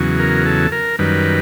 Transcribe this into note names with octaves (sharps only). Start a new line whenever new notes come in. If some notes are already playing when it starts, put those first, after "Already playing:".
Already playing: E2 C#3 F#3
A#4
A4
A#4
F#2 D#3 G3 B4